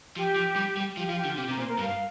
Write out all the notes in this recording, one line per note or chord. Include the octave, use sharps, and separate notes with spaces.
F3 G4
F3
G3
G3
F3 G4
F4
F3
G4
D3
F4
C3 G4
C3 A#4
A#2 C5
A#4
G2 F5